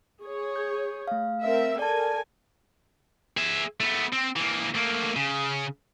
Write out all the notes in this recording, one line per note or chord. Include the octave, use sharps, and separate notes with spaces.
G#4 C#5
G6
A3 F5
C4 A#4 E5
A4 A#4 D5 G#5 A5
G#4 E5
A3 B3
C4
E3 A#3
A3 A#3
C#3